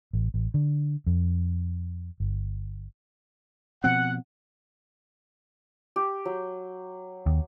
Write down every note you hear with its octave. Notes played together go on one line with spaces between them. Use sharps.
A1
A1
D3
F2
G1
B2 F3 C4 F#5
G4
F#3
D#2